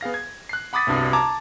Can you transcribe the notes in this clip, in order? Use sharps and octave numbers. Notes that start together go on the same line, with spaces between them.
B3 G#4 F5 A#6
G#6
F#6 C7
F#5 B5 D6 D#6 A6 B6
G1 C2 G2 F#4 D#6
A5 A#5 D6 G#6